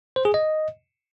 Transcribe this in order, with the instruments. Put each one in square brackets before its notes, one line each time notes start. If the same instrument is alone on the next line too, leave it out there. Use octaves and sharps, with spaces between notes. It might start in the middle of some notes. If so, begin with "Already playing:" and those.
[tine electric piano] C5
G#4
D#5